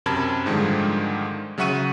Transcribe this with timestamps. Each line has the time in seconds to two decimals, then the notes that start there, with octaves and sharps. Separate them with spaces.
0.06 F#2 C3 A#4 A5 B5 G#6
0.46 G#2 D3 D#3 F3 G3 G#3
1.58 C#3 F#3 E5 F#5 C#6 D#7